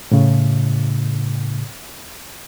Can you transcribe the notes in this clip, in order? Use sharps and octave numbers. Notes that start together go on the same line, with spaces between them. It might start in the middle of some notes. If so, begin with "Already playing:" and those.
A2 C#3